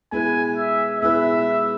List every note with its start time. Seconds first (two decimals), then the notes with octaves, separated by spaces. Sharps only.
0.12 B2 G#3 E4 B4 G#5
0.56 E5
1.00 B2 G#3 E4 B4 E5